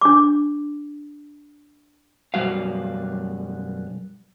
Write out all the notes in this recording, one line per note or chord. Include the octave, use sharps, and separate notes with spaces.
D4 D6
F#2 B2 D#3 G3 F#4 F5